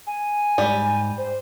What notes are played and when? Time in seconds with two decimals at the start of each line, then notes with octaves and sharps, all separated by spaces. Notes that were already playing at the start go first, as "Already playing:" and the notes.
0.07 G#5
0.58 G#2 G3
1.18 C5